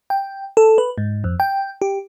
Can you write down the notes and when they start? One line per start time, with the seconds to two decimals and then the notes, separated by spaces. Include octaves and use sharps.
0.10 G5
0.57 A4
0.78 B4
0.98 G#2
1.24 F2
1.40 G5
1.82 G4